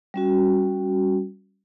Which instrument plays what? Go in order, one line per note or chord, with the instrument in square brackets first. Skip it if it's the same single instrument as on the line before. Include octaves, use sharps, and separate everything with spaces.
[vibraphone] G3 C#4 F#4